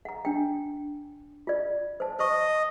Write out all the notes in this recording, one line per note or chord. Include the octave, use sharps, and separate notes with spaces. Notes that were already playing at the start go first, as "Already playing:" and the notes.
F#5 A#5
D4 G5
F4 D5
C5 A5
C5 D#5 C#6